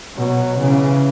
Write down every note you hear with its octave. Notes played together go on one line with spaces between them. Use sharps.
B2 F#3
C#3 E3